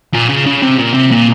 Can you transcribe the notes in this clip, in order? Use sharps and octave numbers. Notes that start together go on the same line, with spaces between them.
A#2
C#3
C#3
C3
A#2
C3
A#2